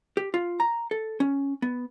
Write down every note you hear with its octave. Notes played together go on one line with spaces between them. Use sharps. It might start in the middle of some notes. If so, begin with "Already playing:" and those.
G4
F4
A#5
A4
C#4
B3